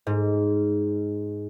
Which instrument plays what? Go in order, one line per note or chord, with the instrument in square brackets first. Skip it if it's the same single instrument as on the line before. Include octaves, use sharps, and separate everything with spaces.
[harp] G#2